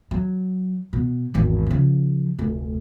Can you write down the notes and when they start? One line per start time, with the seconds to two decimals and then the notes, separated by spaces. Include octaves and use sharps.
0.11 F#3
0.93 B2
1.34 G#1 E2
1.66 C#3 F3
2.39 F1 D2